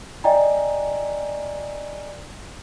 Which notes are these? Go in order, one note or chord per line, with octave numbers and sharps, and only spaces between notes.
D5 D#5 G5 G#5 A#5